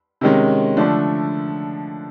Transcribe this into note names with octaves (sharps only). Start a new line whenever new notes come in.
C3 D#3 G#3 C#4
D3 F3 A3 D4